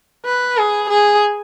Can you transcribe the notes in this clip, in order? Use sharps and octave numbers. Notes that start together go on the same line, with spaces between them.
B4
G#4
G#4